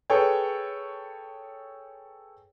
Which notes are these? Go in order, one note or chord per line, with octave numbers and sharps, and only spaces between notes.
G#4 A4 B4 C#5 G5